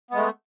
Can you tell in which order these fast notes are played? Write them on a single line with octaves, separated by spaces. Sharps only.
B3 G#3 A3